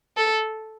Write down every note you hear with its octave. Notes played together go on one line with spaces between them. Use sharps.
A4